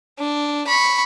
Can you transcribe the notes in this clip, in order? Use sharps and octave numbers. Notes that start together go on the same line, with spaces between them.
D4
B5 C#6